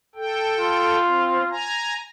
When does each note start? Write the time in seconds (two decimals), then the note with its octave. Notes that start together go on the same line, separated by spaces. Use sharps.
0.15 A4 G5
0.59 F4
1.05 C4
1.49 G#5 A#5